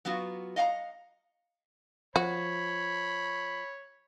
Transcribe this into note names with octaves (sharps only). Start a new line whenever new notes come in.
F#3 B3 F4 F#4
D#5 F5 F#5 G#5 A#5
F3 F#4 C#5 B5